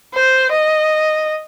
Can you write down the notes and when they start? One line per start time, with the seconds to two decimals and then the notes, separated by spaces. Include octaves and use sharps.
0.14 C5
0.51 D#5